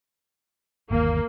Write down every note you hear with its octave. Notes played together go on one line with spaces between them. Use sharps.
G1 D#2 A#3